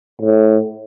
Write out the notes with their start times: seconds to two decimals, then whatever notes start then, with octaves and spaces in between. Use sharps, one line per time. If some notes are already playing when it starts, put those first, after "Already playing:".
0.21 A2